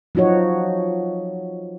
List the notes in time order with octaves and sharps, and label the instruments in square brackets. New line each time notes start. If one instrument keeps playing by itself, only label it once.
[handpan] F3 F#3 D#4 F#4 C#5